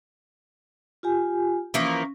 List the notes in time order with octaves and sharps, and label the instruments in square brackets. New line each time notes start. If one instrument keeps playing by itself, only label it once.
[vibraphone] F4 G4 G#5
[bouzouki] E3 F3 A#3 [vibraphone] C#4